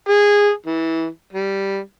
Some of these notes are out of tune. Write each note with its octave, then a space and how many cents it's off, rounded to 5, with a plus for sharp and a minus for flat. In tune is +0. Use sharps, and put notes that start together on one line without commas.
G#4 -15
E3 -20
G3 -5